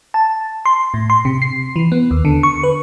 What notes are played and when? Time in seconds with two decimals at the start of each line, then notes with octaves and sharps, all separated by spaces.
0.14 A5
0.66 C6
0.94 A2
1.10 C6
1.25 C3
1.42 C7
1.76 E3
1.92 B3
2.11 D#2
2.25 D3
2.43 C#6
2.63 B4